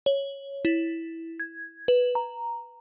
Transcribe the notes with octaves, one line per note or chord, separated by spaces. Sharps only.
C#5
E4
G#6
B4
A#5